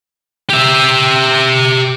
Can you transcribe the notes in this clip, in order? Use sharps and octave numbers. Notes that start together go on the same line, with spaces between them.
G4 E5